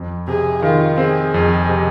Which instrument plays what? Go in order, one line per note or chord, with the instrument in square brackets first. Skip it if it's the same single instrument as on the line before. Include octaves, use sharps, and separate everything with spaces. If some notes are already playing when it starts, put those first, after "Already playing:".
Already playing: [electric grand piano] F2
[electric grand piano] C3 [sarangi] G#4
[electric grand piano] D#3 [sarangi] F4
[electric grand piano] C4 [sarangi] G#4
[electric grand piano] F2 [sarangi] G#4
[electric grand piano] C3